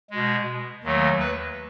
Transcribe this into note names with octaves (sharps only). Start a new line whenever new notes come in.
B2 G#3
D#2 D#3 F#3 A3
B4